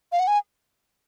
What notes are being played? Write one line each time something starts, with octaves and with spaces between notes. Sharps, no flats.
F5
F#5
G#5